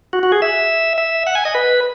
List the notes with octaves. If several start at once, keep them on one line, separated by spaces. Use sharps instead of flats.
F#4
F#4
G#4
E5
E5
F#5
G#5
D#5
B4